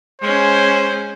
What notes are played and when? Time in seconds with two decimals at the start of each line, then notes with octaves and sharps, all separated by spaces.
0.21 G#3 C#4 C5